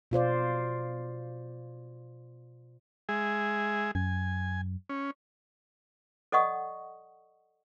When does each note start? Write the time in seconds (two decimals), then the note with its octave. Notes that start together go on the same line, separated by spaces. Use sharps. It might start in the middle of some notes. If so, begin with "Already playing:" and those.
0.11 B2 F4 C5 D5
3.09 G#3 G#4 E5
3.95 F#2 G#5
4.89 C#4
6.32 A4 D5 D#5 F#5 C#6 D#6